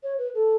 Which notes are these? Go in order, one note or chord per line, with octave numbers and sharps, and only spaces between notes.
C#5
B4
A4